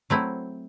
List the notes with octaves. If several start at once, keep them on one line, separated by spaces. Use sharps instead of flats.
F#3 A3 C4 E4